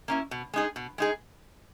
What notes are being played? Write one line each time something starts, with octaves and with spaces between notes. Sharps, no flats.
A#3 C#4 E4
B2
G#3 D#4 G#4
B2
G#3 D#4 G#4